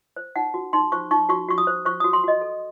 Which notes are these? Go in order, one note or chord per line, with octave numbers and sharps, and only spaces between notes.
C5
D#4 F#5
F#4
D#4 C6
C5 C#6
D#4 C#6
F#4 C#6
F#4 C#6
D#6
C5
C5 C#6
F#4 D#6
C6
F#4 D#5
A4